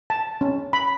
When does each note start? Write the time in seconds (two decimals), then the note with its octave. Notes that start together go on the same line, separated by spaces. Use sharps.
0.10 A5
0.41 C#4
0.73 B5